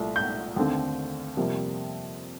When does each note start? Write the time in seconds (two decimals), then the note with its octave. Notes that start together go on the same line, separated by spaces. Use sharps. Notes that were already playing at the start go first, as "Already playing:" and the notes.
Already playing: C2 A#2 A3
0.16 G6
0.56 D#2 D3 A3 C4
1.37 F2 C3 G3 A#3